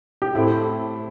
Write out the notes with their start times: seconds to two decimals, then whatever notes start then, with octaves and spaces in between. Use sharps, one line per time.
0.22 G4
0.35 A2 A3 C4 E4